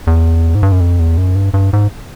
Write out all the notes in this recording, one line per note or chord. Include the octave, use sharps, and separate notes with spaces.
E2
G#2
G2
F#2
F2
E2
F#2
G2
G2
G#2